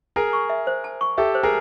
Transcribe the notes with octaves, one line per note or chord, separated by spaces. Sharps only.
G#4 A#4 A5
C#6
E5
C5
A5
C#6
G4 A4 E5
C5
G#4 A#4